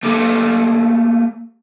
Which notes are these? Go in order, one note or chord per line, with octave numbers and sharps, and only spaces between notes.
A3 A#3 G4 A4